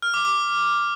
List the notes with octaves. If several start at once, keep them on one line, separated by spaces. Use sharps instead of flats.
F6
D6
D6